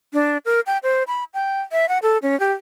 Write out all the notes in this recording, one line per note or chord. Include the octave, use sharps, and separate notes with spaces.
D4
A#4
G5
C5
B5
G5
E5
F#5
A4
C#4
G4